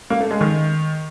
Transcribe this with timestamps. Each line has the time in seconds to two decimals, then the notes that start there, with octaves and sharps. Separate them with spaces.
0.10 A#3
0.20 A3
0.31 G#3
0.41 D#3